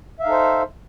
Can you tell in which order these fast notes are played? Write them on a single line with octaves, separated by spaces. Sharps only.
E5 F5 D#4 A4 C5